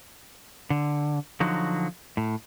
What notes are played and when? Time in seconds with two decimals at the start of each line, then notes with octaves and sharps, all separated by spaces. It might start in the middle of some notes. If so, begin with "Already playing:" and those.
0.70 D3
1.40 D3 F3 F#3 D#4 F#4
2.17 A2